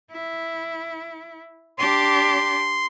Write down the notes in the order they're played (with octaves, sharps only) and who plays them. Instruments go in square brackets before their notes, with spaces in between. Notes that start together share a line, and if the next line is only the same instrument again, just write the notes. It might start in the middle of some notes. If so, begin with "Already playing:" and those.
[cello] E4
[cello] D4 G4 [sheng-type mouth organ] C6